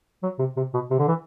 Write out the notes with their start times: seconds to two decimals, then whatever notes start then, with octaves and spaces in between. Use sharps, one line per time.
0.23 F#3
0.39 C3
0.57 C3
0.74 B2
0.91 C3
0.99 D3
1.08 E3